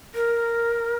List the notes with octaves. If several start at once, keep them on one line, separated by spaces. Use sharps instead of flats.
A#4